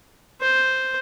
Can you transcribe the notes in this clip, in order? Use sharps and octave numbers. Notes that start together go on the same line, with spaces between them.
C5